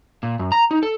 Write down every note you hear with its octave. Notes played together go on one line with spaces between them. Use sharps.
A#2
F#2
A#5
D#4
A4